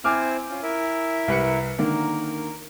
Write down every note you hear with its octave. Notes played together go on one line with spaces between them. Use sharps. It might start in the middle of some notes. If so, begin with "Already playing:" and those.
C4 E4 C5 G#5 D6 F6
C#4 F4
E4 A#4 E5
C2 B4 C#7
D3 D#3 A#3 A#4